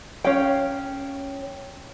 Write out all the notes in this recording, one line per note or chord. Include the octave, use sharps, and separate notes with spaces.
C#4 C#5 F5 G5